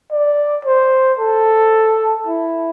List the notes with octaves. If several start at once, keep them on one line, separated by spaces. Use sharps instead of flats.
D5
C5
A4
E4